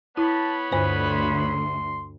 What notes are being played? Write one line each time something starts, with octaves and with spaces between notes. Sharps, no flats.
B3 E4 C#5 A5 B5
D2 G2 B4 C5
C6